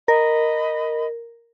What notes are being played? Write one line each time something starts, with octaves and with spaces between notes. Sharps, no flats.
A#4 D#5 B5